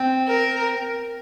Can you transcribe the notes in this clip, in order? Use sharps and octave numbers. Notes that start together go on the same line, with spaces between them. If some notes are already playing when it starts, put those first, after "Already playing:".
Already playing: C4
A#4